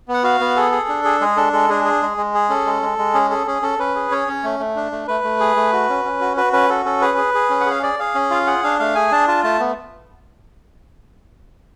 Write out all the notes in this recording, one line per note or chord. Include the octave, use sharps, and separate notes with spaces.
B3
F#5
F#4 F5
B3
G#4 A4
G#4
D4
G#4
G#3 G#4
D4 A4
G#3 A4
D4 G#4
G#4
G#3
G#3
G#4
C#4 A4
G#3
G#3
G#3
C#4 G#4
G#4 A4
C#4 G#4
C#4 A4
C#4 B4
G#4
C#4 C#5
C#4
A3
A3
D4
A3
A3 B4
A3
G#4
A3
F#4
C#4
C#4
F#4
F#4 B4
C#4 B4
F#4 A4
C#4 A4
G#4 B4
G#4
G#4
C#4
F#5
G#4 F5
G#4 D5
G#4 F5
C#4
F4 F5
G#4 F#5
D4 F5
A3 F5
G#4 G#5
D4 A5
F4 A5
A3 A5
B3